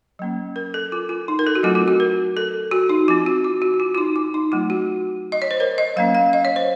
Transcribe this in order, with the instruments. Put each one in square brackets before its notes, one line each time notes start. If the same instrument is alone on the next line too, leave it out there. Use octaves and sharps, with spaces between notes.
[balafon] F#3 A#3 C#4
A#4
A4
F4
F4
D#4
A#4
A4
F#4
F#3 A3 C4 F4
F4
F#4
A#4
A4
F#4
D#4
F3 C4 F4
F#4
F4
F#4
F#4
F4
F4
D#4
F4
D#4
F#3 A3 C4 F4
F#4
D#5
C#5
C5
A#4
D#5
F#3 A#3 C#4 F5
F5
D#5
C#5
C5